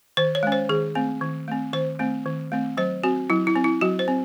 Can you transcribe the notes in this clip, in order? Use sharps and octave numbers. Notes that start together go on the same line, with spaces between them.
D#3 C5
C#5
G#3 C#4
C5
D#3 G#4
A3 C4
D#3
A3 C4
D#3 C5
A3 C4
D#3
A3 C4
F#3 C5
C4 F#4
F#3 E4
E4
C4
E4
F#3 F#4
C5
C4